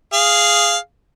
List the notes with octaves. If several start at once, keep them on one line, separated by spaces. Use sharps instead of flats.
G#4 F5